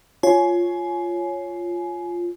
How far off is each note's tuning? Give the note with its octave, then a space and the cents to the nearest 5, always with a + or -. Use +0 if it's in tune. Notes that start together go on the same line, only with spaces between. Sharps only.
F4 +0 C#5 +0 G#5 +25